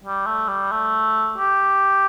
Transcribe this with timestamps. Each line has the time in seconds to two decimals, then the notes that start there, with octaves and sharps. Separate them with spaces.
0.04 G3
0.26 A3
0.48 G3
0.72 A3
1.38 G4